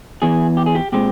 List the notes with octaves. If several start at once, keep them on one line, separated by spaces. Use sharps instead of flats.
E2 E3 G#4
G4
G#4
G4
A#2 G#3 C4 G4